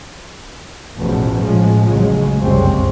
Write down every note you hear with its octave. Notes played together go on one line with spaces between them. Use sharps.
A1 E2 B2 F3
A2 F3 G#3
A1 D2 C#3 F#3 G#3
F#1 C2 F2 C#3 G#3 C4